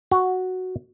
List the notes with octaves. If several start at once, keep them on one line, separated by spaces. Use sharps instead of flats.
F#4